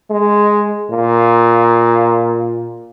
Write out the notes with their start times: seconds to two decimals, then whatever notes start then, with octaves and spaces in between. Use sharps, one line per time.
0.10 G#3
0.91 A#2